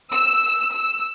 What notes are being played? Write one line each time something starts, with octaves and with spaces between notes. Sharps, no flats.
E6
E6